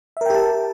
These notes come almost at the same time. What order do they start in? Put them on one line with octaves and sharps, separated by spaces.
E5 A#4 G5 G4 A5